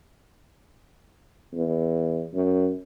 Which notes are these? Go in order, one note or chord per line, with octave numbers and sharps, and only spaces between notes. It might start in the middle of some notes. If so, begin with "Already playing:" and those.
E2
F#2